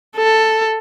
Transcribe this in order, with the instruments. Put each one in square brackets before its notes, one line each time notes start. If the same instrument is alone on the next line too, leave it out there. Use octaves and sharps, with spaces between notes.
[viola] A4